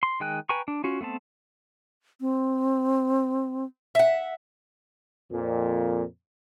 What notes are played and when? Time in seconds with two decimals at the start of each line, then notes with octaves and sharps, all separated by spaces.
0.03 C6
0.20 D#3 G#3 G5 G#5 F#6
0.49 B4 G5 G#5 A#5 C#6
0.68 D4
0.84 C#4 F4 F#4
1.01 A3 B3 C4 A5
2.21 C4
3.95 E5 F#5
5.31 F2 A#2